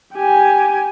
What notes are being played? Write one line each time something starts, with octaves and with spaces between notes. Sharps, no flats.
G4 G#5